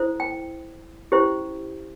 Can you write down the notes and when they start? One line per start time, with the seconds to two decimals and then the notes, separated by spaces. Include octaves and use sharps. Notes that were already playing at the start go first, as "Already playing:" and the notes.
Already playing: E4 A4 C5
0.20 G5
1.12 C#4 E4 G4 C5